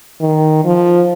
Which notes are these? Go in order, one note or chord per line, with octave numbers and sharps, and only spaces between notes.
D#3
F3